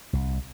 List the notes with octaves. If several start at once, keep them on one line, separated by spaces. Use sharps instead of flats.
C2